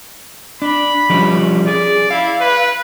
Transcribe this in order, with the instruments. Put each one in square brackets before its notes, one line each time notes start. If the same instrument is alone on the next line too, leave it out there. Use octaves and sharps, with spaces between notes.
[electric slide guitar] D4 [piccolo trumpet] B5
[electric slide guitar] F3 G3 C#4
[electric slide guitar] G#4 [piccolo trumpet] D5
[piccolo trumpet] E4 [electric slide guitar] F5
[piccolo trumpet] B4